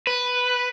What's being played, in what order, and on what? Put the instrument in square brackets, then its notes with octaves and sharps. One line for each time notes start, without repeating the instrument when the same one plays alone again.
[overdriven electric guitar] B4